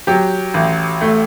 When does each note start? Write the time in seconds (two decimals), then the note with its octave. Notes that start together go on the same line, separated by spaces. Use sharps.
0.07 F#3 G4
0.54 A1
1.01 A3